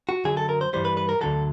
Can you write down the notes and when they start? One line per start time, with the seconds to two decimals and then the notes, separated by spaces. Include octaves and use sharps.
0.09 F#4
0.24 F#2 D3 F#3 G#4
0.37 A4
0.49 A#4
0.61 C5
0.73 G2 E3 G3 C5
0.85 B4
0.97 B4
1.09 A#4
1.21 D2 D3 F#3 A4